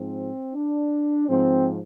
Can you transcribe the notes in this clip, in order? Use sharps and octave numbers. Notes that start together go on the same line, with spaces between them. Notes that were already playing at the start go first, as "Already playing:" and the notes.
Already playing: G#2 F3 C4
D4
G#2 F3 C4